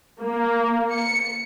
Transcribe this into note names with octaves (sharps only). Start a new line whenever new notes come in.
A#3
C#7